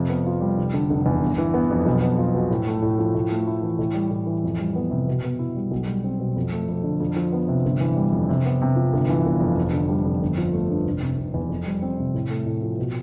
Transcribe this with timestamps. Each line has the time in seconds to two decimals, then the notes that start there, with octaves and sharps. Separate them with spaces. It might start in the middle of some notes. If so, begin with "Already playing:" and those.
Already playing: F2 C3
0.09 B3
0.26 F4
0.41 G3
0.57 F1
0.74 D3
0.90 F1
1.06 E2
1.22 G1
1.38 E3
1.54 B3
1.71 F2
1.86 B1
2.02 B3
2.18 F4
2.35 B2
2.51 A2
2.67 A3
2.82 A2
2.99 F3
3.15 A2
3.31 A3
3.47 E4
3.63 E3
3.79 A2
3.94 G3
4.10 A2
4.27 E3
4.44 F2
4.59 G3
4.76 B3
4.91 C3
5.08 B2
5.24 B3
5.39 E4
5.56 G3
5.71 B1
5.87 G3
6.04 C4
6.19 B2
6.36 F2
6.52 A3
6.69 F2
6.84 D3
7.00 F2
7.16 F3
7.33 B3
7.48 C3
7.65 G1
7.80 E3
7.96 G3
8.12 F2
8.29 C3
8.45 B3
8.61 C3
8.76 F3
8.92 G1
9.09 E3
9.25 G1
9.41 F2
9.57 F1
9.73 D3
9.89 G3
10.06 F2
10.22 G1
10.38 F3
10.54 A3
10.70 G2
10.85 F1
11.01 C3
11.18 F1
11.34 E2
11.49 F2
11.65 G3
11.82 C4
11.98 C3
12.14 A2
12.30 A3
12.46 A2
12.62 F3
12.78 B2